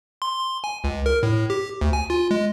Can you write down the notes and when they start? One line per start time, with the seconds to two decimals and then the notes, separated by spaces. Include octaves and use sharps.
0.22 C6
0.40 C6
0.64 G#5
0.84 C#2
1.06 A#4
1.23 A2
1.50 G4
1.81 D2
1.93 G#5
2.10 F4
2.31 G#3